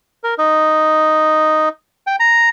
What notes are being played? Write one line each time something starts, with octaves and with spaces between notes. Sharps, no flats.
A#4
D#4
G5
A#5